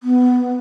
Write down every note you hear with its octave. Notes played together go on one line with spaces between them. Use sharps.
B3